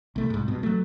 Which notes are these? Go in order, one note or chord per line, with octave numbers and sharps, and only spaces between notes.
C2 A3
C2 G#2
G2 B2
F#3 A3